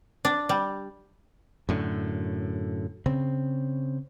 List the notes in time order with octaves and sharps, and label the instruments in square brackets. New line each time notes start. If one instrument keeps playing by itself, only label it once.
[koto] D4
G3
[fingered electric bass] F#2 A2 D3
C#3 C4